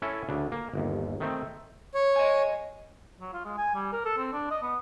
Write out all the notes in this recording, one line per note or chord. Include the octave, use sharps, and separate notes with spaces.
C#4 E4 A4
D2 C#3 D4
A#3
G1 D#2
D#3 A3 C4
C#5
D#5 G#5
F#3
F4
G#3
G#5
G3
A#4
A4
C4
D4
D#5
B3